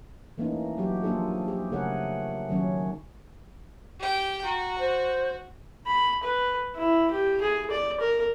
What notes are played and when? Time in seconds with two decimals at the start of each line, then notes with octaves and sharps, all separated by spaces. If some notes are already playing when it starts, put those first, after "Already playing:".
0.38 E3 A3 A#3 C#4 D#4
0.77 F#3 F#4 G4
1.03 F3 A#3 D4 F4 G#4 A4
1.48 G4 G#4
1.72 C#3 A3 G#4 A#4 C#5 F#5
2.49 D#3 F#3 C#4 C#5
3.99 G4 G5
4.45 F#4 A#5
4.79 C5
5.86 B5
6.23 B4
6.75 E4
7.11 G4
7.41 G#4
7.71 D5
8.00 A#4